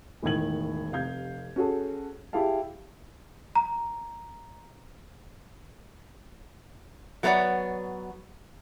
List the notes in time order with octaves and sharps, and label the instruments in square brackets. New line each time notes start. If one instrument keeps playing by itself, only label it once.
[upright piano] E1 A2 D#3 G#6 F#7
F1 C3 F5 G6 G#6
C#4 F#4 G#4 A4
E4 G4 G#4 F5 A5
[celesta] A#5
[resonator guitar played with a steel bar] F#3 A3 B3 C#5 D5 F#5